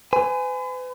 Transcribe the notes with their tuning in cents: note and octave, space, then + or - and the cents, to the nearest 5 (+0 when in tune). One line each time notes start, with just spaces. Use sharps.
B4 +45 G#5 +0